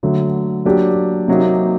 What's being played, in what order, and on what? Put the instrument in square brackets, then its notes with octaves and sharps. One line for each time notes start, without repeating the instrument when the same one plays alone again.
[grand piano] D3 F#3 A3
F#3 A#3 D4 G4
C3 F#3 A#3 D#4 G4